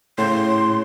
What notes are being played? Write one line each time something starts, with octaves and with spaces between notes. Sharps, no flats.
A2 C#3 A#5 C6